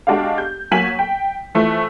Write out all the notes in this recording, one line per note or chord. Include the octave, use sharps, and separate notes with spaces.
G#3 D4 F#4 G4 F5
G6
F#3 A#3 G#5 B6 E7 F#7
G5
E3 F3 A3